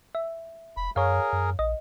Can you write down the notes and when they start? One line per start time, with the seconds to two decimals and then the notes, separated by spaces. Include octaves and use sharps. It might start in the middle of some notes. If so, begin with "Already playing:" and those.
0.15 E5
0.77 F1 B5
0.96 F#2 G#4 A#4 C#5 F5
1.33 F#2
1.59 A#1 D#5